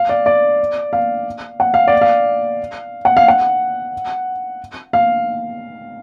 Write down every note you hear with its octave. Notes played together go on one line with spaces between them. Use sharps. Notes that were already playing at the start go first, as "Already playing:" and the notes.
Already playing: F5
D5
D5
F5
F#5
F5
D5
F5
F#5
F5
F#5
F5